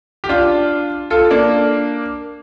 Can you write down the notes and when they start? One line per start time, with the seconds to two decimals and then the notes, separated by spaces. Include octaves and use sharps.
0.24 G4
0.29 D4 F4
1.10 F4 A4
1.31 A#3 D4